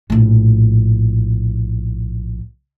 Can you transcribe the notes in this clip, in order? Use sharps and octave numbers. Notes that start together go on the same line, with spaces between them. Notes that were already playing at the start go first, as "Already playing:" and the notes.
A#1 A2